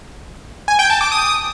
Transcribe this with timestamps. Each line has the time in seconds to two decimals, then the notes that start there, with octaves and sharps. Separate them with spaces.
0.68 G#5
0.79 G5
0.90 A5
1.01 D6
1.12 D#6